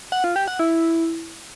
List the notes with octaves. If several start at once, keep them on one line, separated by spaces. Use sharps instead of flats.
F#5
F4
G4
F#5
E4